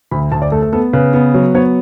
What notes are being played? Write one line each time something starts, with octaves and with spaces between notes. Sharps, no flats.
D2 B5
D2 A5
D5
A3 A4
A4
B3 A4
C#3 B4
B3
F#3
B3 C#5